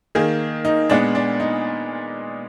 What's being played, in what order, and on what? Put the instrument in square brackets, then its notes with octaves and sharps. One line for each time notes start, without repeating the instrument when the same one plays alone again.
[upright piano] D#3 A#3 G#4
D#4
A#2 G#3 B3 D4
D4
D#4